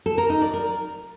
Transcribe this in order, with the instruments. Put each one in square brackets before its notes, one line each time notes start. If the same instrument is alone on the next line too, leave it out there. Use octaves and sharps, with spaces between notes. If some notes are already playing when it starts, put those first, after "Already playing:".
[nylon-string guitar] A4
A#4
D#4
D5
A#4